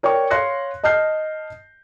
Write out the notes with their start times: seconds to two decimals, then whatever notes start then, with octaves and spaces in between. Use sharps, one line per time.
0.03 A#4 C#5 D5 G5 C#6
0.30 C#5 F5 C6 F#6 A#6 C#7
0.84 D#5 A5 F6 G6 C7